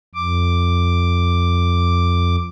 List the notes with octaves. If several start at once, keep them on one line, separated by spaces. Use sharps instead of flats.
F2 D6